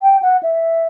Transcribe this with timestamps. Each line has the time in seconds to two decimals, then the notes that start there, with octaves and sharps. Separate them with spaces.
0.02 G5
0.22 F#5
0.43 E5